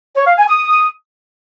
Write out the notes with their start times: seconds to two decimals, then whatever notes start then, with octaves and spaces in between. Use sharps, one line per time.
0.16 C#5
0.26 F5
0.37 G#5
0.48 D#6